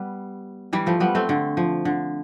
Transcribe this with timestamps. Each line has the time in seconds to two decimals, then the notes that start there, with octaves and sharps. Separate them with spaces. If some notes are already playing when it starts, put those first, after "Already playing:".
Already playing: G3 B3
0.73 E3 G3
0.86 F3 A3
1.00 G3 B3
1.15 A3 C4
1.29 D3
1.57 F3
1.85 D3